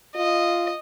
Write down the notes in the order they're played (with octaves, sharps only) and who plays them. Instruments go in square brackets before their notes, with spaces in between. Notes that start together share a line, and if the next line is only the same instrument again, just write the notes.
[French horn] F4 [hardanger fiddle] D#5